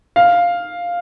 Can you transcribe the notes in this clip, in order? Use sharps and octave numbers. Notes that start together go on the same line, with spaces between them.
F5